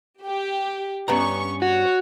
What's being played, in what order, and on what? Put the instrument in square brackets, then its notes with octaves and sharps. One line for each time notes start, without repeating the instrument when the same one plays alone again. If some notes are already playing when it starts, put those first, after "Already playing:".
[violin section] G4
[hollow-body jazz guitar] G2 B3 A#5 [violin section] C#4 C#6
[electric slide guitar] F#4 [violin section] C#5